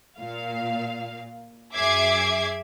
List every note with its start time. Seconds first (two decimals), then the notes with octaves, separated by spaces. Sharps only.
0.19 A#2 F5
1.75 F#2 G#4 E5 D6 G#6 C7